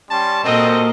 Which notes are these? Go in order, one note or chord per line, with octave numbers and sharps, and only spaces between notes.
G3 C#4 A5 C6
A#2 C4 F#4 A4 A#4 D#5